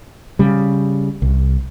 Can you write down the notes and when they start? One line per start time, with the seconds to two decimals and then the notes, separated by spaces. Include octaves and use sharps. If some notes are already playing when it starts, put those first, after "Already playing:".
0.39 C#3 G3
1.22 C2